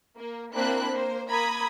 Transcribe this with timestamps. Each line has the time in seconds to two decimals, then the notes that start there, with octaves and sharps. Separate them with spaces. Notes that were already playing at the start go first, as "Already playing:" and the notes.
0.18 A#3
0.54 A#3 C4 D4 E4 B5 F#6
0.90 A#3 C5
1.30 A#3 A#5 B5 D#6 G#6